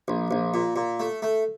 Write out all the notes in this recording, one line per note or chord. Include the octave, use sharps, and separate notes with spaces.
A#1
A#1
A#2
A#2
A3
A3